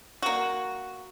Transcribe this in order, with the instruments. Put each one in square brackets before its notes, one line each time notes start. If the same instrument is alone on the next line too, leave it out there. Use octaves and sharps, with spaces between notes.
[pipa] A#3 F#4